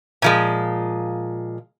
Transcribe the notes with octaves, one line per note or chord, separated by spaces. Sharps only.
A#2 F3 G#3